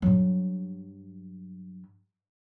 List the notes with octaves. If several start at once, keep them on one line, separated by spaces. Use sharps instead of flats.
G2 F#3